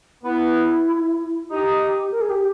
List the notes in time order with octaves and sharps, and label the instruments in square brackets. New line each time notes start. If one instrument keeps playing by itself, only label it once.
[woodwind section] B3 [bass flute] E4
[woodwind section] D#4 [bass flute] G4
[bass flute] A#4
G#4
G4